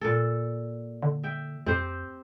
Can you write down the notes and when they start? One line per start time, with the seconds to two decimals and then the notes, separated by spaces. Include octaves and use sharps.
0.01 A#2 A4
1.03 D3
1.24 E5 G5
1.66 F2 C4 G4 C5